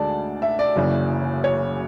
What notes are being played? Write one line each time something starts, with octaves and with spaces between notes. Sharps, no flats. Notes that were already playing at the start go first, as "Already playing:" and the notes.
Already playing: D2 D3 G#3 D5 A5
E5
D5
F#1 F#2 C#3 E3
C#5